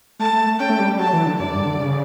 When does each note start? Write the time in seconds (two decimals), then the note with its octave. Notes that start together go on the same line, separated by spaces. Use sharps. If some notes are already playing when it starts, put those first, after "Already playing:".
0.19 A3 A5
0.33 A3
0.46 A3
0.60 C#4 G5
0.70 A3
0.79 G3
0.90 G3
0.99 F#3 A5
1.13 E3
1.26 D3
1.39 F#2 D5
1.52 G2
1.66 D3
1.80 C#3